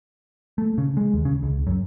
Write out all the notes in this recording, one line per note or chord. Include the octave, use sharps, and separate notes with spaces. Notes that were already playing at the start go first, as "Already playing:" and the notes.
A3
C#3
G#3
D#2
C#3
C#2
F#2